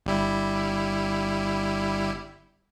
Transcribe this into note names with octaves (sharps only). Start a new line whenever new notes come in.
G1 G3 E4